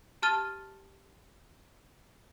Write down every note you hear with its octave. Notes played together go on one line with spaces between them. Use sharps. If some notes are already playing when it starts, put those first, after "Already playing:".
G4 A5 F6 A6 G7